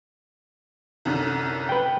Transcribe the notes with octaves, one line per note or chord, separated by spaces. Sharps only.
C2 F#2 D3
B4 G5